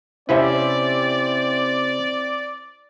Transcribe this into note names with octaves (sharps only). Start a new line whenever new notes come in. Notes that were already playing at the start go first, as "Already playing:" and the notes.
C3 C4 C#4 E4 B4 C5 D5 E5